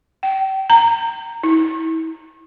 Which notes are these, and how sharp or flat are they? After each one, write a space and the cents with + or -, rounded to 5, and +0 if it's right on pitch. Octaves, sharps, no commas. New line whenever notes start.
G5 -30
A#5 -15
E4 -35